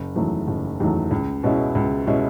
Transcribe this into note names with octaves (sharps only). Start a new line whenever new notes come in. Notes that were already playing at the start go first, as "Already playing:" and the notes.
Already playing: F#1
E2 D#3 F#3 A3
F#1
E2 D#3 F#3 A3
C#2
B2 G#3 C#4 E4
C#2
B2 G#3 C#4 E4